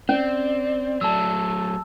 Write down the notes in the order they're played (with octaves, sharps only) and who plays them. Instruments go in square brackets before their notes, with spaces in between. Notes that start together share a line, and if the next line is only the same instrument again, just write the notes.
[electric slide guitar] C4 [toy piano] C#4 [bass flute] D5
[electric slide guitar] F#3 A3 [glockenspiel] A5 E6